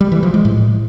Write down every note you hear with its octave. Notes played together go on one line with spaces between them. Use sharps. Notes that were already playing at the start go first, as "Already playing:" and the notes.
G3
E3
F3
G#3
A2